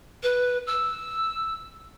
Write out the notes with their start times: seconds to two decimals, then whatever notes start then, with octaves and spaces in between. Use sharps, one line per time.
0.23 B4
0.67 E6